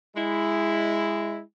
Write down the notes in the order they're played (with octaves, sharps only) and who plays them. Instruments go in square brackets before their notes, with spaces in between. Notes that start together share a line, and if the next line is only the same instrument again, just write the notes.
[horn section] G#3 E4